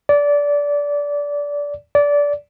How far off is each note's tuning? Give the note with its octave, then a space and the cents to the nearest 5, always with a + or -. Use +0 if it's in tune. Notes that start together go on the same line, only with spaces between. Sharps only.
D5 -20
D5 -20